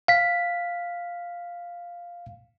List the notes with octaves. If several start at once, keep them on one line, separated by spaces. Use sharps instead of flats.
F5 B6